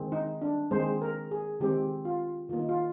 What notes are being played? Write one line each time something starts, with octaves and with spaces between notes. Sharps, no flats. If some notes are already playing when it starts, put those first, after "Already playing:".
Already playing: D#3 G#3 C4
D#4
D4
D#3 G#3 C4 C5
A#4
G#4
D#3 G#3 C4 G4
F4
D#3 A#3 F4
D#4
F4